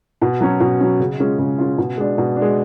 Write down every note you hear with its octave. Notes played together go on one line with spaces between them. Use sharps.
B2
F#3 C#4
B2
F#3 C#4
C#3
G#3 C#4 F4
C#3
G#3 C#4 F4
B2
G#3 D4
B2
D4
G#3